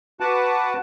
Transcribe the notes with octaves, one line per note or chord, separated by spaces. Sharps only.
F#4 B4 F#5 A5 D6